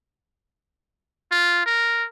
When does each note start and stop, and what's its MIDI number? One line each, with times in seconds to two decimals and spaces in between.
1.32 1.61 65
1.66 2.05 70